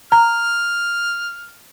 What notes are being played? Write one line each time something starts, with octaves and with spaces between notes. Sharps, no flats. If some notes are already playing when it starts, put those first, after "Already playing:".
A#5 F6